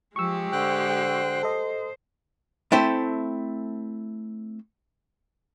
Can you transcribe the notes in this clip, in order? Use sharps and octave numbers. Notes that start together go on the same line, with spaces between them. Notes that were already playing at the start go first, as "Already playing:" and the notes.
F3 G#3 G4 C#6 E6
D3 C5 G5 F#6
A4 D#5
A3 C4 E4 A4 C5